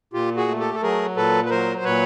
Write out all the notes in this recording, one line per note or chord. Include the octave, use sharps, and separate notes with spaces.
A#2 F4 G4
F#4 G#4
A3
G4 A4
A4
F#3 G#4 A#4
A#2 A4 B4
B4
F#3 A#4 C5
C5
A#2 B4 C#5